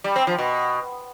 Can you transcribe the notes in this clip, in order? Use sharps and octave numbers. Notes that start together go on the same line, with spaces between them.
G3
C4
F3
B2